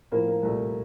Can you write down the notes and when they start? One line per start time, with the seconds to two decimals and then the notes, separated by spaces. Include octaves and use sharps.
0.12 A2 F3 A#3
0.28 A#3
0.43 C2 A#2 A3